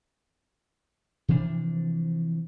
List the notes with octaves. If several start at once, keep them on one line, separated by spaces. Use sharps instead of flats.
C3 E3 F3 D4